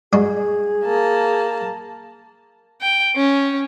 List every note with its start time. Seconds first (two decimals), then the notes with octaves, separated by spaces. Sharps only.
0.13 G2 G#3 F#4 G#4
0.84 A#3 A5
2.81 G5
3.16 C#4